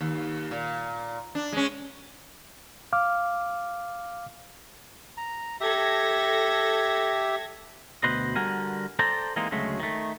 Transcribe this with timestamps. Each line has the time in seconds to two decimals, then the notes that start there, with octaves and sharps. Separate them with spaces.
0.01 D#2
0.51 A#2
1.35 D4
1.52 G#3 C#4
2.93 F5 D6 F6
5.17 A#5
5.61 G4 A4 E5 G#6 A#6
8.04 D2 B2 B4 C5 D#5
8.36 D3 G3 F#4 A#4 G#5
8.99 A4 C5 D5 G5 A5 A#5
9.36 E3 G#3 A#3 C4 D#4
9.51 D2 C#3 F#3 G#3 A3
9.80 D#3 A3